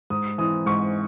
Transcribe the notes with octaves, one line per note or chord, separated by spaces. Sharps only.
G#2 D#6
E3 C4 D#6
G#2 C#6